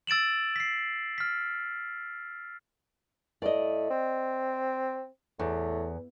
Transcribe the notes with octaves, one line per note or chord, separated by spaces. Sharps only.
E6 A6 D7 E7 F#7
B6 C7
F6 B6
A2 D5 D#5
C4
E2 A2